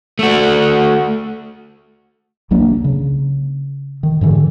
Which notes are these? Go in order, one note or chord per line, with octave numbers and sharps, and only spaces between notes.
A3 F#4
C2 F#3 A#3 D4
C#3
D#3
G#2 D3 E3